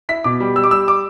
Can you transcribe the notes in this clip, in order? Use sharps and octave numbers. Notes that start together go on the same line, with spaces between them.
E4 B6
B2 D6
G3
G3 E6
D6
G3 E6
D6